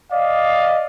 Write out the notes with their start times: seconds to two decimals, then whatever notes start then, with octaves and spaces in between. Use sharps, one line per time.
0.12 D5 D#5 F5